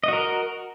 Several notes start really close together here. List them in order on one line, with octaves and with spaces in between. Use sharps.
D#5 F#4 A#4